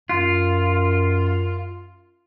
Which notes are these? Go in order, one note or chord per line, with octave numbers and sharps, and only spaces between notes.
F#2 F4